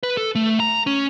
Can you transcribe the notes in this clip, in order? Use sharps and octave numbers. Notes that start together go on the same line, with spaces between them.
B4
A4
A3
A#5
C#4